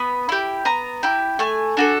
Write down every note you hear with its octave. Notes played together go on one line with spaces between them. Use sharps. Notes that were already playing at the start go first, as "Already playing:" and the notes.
Already playing: B3 B5
E4 G4
B3 A#5
E4 G4
A3 G#5
D4 F#4 A4